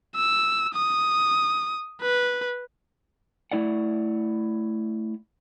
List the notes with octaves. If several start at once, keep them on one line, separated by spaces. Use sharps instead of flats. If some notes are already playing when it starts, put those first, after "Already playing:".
E6
D#6
B4
A3 E4 D5 F#5